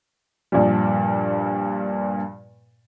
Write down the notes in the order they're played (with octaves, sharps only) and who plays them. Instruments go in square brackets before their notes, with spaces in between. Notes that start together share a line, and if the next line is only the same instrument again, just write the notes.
[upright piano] G2 A#2 F3 G3